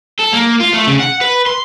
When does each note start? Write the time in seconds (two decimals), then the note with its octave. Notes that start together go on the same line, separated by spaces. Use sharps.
0.20 A4
0.33 A#3
0.61 F4
0.74 A3
0.88 C#3
1.00 F#5
1.21 B4
1.47 C6